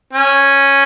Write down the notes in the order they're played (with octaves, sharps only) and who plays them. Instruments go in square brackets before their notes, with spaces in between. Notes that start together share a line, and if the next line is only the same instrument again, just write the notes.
[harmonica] C#4